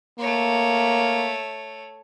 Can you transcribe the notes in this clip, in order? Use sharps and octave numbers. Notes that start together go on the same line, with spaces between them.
A3 A#3 C#5